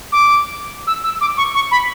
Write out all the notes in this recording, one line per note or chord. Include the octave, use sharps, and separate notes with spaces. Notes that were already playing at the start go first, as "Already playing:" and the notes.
D6
E6
E6
D6
C#6
C#6
B5